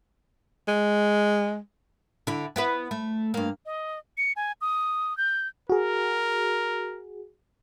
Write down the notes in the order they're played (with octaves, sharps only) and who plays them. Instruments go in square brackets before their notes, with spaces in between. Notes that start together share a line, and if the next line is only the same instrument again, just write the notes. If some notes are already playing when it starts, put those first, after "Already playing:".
[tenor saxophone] G#3
[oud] D3 E4
B3 E4 B4
A3
G2 A#3
[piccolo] D#5
C#7
G#5
D#6
G6
[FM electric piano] F#4 G#4 [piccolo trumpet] A#4